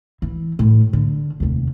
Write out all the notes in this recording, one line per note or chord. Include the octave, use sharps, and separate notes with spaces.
E3
A2
D3
F1 D#2